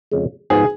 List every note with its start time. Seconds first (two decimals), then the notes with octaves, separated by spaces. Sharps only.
0.11 F2 C#3 G#3
0.50 G#2 F3 B3 F#4 G#4